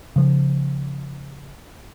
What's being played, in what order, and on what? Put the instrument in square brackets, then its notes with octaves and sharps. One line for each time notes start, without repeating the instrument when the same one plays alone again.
[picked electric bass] C#3 F3